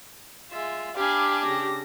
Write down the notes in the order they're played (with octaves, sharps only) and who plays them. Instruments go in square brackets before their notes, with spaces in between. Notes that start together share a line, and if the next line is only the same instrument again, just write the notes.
[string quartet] G#3 F4 E5
[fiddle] D4 G4 [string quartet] F5 G#5 B5
[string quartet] C#3 A#6